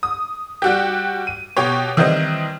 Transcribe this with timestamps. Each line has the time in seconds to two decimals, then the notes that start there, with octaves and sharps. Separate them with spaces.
0.03 D#6
0.62 G3 F#4 G4
1.27 D#7
1.57 B2 G4 C#5
1.97 D#3 E3 G3 C4 D#4